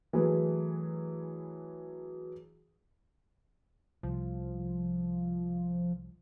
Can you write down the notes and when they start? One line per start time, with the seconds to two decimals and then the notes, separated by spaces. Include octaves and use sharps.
0.13 E3 F#3 A3 G#4 B4
4.03 C2 F3